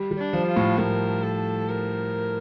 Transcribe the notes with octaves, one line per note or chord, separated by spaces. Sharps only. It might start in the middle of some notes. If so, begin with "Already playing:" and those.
Already playing: G3
G3
D4
F3
F4
A2
A2 A#4
A4
A#4